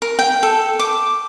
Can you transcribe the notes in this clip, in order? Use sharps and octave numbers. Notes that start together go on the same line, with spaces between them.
A#4
G5
A4
D6